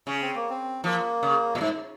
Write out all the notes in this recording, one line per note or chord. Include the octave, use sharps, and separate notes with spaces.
C#3 C#4
C4
A#3
C4
F3 A#3
C#3
A#2
G#2